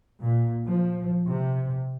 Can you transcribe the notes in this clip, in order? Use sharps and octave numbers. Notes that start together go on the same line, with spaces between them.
A#2
F3
C3